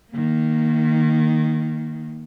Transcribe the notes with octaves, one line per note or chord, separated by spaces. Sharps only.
D#3 A#3